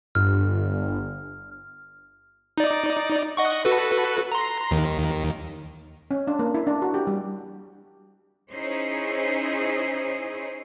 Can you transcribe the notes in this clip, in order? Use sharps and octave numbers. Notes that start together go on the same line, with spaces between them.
G1 F6
D#4 D5
D#5 F#5 C#6
F#4 A4 B4
A#5 C6
D#2 D#3
C#4
D4
A#3
E4
D4
F#4
G4
G3
C#4 D#4 E4 G#4 C5 C#5